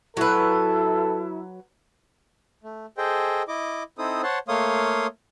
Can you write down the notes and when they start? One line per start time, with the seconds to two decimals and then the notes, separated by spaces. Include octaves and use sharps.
0.17 F#3 E4 A4 B4
2.63 A3
2.98 G#4 A4 C5 D#5 G5
3.48 E4 D#5 D6
3.98 C4 D#4 E4 A4 C5 D#6
4.23 C5 C#5 F#5 A5 C6
4.48 A3 A#3 C#5 F5 C6 D#6